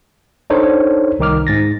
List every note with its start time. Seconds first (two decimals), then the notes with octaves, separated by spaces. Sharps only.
0.50 D4 D#4 A4 C5 C#5
1.19 C2 D#3 D#4 D6 F6
1.47 G#2 A6 A#6